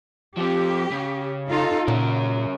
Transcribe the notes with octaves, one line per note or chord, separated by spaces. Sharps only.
F3 C4 G4
C#3
D#4 F4 A4
A#2 C#3 C#4 A#4